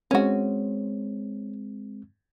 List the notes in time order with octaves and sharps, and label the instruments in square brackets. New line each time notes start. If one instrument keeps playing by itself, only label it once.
[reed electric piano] G#3 C4 [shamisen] C#4 F#4